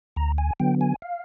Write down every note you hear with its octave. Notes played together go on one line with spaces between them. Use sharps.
D2 A#5
G#5
D3 F#3 B3 G5
G#5
F5